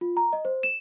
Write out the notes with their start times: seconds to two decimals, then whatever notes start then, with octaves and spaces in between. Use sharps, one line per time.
0.01 F4
0.17 A#5
0.33 D#5
0.45 C5
0.63 E7